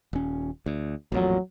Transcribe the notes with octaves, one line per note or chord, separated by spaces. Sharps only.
D#1 C#4
D2
A1 F2 A#2 F#3